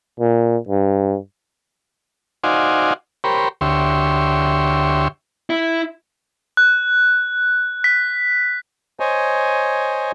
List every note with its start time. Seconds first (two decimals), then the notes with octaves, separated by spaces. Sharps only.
0.20 A#2
0.68 G2
2.44 D#4 F#4 C5 D5 F5 G#5
3.24 G4 A#4 C5 C#5 B5
3.61 D2 G4 C#5 E5 C6
5.50 E4
6.57 F#6
7.84 B6
9.00 C5 C#5 D#5 G#5